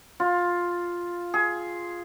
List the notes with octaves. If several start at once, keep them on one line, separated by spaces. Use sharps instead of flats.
F4
G#4